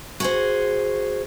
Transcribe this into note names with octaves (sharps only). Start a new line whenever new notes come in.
F#4 G#4 C5